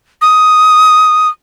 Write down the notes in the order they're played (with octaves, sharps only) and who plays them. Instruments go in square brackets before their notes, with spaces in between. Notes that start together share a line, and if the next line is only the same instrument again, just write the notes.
[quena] D#6